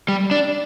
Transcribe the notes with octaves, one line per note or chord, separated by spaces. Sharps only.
G3
D4